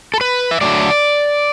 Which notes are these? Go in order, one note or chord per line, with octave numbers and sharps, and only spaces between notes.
A4
B4
E5
D3 F#3 A3 D5